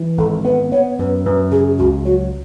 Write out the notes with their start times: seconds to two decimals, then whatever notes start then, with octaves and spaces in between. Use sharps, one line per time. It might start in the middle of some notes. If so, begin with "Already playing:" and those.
Already playing: E3
0.18 G#1 A4
0.45 B3 B4
0.72 B3 C#5
0.99 F#2 B4
1.25 F#2 B4
1.52 C#3 G#4
1.78 C#2 F#4
2.05 F#3 F#4